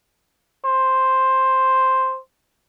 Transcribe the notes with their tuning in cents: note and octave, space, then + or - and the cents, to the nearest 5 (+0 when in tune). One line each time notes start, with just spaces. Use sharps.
C5 +5